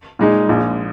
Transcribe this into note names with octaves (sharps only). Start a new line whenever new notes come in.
A#2 G#3 D#4 G#4
A#1 A#2 G#3